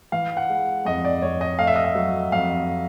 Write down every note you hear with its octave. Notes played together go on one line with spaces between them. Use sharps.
E3 F5
F#5
G#3
F2 D#5
D5
F2 C#5
D#5
A3 F5
E5
D#5
E5
F#3
F2 F5